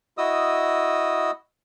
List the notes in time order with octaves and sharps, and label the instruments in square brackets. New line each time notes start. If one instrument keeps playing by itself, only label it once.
[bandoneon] E4 F#4 D#5 D#6 E6